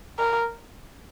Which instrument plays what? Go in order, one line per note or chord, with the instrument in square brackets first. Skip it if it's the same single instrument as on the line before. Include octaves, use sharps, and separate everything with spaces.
[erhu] A#4